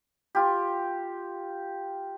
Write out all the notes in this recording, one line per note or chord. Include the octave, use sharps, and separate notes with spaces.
F4 G4